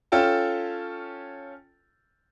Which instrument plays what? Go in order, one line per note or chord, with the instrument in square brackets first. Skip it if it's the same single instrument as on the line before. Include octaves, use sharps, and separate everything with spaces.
[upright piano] C#4 F4 A4 G5 A5